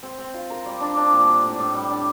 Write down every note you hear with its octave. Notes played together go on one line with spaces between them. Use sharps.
C4
C4
F4
A#4
G3
D4
D4
A#2
G3
A2
A2
G3
D4